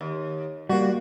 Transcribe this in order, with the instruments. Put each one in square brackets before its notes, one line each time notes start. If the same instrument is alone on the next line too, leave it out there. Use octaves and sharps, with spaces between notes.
[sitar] D#2
[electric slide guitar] G3 A#3 [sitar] F#4